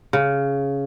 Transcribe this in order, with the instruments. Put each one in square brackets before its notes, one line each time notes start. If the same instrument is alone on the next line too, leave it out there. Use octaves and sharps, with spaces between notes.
[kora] C#3